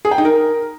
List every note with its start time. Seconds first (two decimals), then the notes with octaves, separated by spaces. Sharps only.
0.05 G#4
0.11 G5
0.18 D#4
0.25 A#4